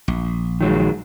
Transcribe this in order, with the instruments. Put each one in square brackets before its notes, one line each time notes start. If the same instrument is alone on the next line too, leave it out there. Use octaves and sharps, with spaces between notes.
[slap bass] A#1
[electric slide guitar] D#3 F#3 G#3